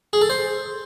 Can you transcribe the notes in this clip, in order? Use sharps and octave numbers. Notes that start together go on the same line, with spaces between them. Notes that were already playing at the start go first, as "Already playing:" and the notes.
G#4
A4
C5